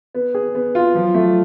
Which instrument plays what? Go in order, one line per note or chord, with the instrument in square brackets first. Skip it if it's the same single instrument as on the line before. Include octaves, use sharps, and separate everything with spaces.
[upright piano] B3
G#4
B3
F4
[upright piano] F3 [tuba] F#3
[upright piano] A3